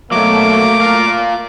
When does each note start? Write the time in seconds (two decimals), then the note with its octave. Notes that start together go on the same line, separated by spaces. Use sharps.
0.12 B2 F#3 A3 A#3 D6
0.81 F4 A#4 F5